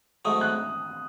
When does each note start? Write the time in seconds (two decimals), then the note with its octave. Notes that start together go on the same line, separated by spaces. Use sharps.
0.25 G#2 F#3 A3 D#6
0.41 F#6